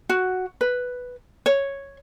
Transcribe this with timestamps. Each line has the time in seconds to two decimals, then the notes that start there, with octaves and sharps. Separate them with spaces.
0.09 F#4
0.61 B4
1.46 C#5